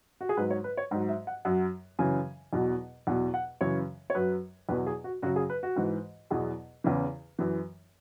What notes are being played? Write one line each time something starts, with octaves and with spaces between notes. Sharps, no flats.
F#4
G#4
G#2 F#3 B4
C#5
B4
C#5
G#2 F#3
E5
F#5
F#2 F#3 F#5
F#2 C#3 E3 G#5
E2 B2 F#3
E2 B2 F#3 F#5
F#5
F#2 C#3 E3 C#5
C#5
F#2 F#3 B4
E2 B2 F#3 B4
G#4
F#4
F#2 C#3 F#3 F#4
G#4
B4
F#4
G#2 E3
E2 B2 F#3 G#4
E2 C#3 E3
F#2 E3